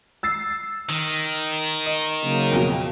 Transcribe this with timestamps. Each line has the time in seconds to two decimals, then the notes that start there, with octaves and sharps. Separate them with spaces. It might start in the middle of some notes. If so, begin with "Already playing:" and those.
0.23 E6 A6 C7
0.89 D#3
1.86 D#5
2.23 C#3 F#3 A#3
2.52 F2 B2